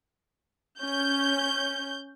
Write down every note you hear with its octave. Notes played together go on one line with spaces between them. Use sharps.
C#4 G6